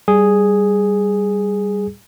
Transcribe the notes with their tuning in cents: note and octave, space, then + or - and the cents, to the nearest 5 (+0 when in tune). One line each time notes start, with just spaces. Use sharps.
G3 +0 G#4 +0